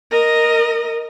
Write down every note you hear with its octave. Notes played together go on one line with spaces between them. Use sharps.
A#4 D#5